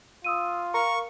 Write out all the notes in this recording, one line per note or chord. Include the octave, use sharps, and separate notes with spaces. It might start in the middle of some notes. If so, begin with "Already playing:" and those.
F4 D#6 E6 D#7
A#4 F5 A#5 C#6